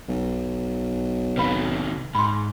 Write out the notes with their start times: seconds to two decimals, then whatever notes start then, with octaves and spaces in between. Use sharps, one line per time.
0.09 B1
1.37 C3 D#3 B4 F5 B5
2.15 G#2 B5 C6